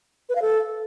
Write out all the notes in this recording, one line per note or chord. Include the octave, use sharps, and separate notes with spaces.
B4
F5
A4